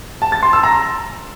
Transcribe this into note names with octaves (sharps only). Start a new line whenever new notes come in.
A5
A6
C6
E6
A#5